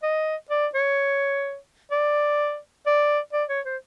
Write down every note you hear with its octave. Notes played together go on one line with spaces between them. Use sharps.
D#5
D5
C#5
D5
D5
D5
C#5
C5